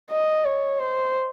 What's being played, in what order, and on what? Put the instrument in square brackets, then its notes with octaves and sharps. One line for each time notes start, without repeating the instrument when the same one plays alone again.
[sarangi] D#5
C#5
C5